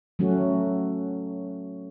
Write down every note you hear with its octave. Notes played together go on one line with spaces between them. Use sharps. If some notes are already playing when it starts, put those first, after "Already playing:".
F#3 A3 C#4 F#4